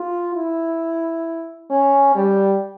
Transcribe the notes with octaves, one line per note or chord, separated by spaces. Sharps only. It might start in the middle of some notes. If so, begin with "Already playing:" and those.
Already playing: F4
E4
C#4
G3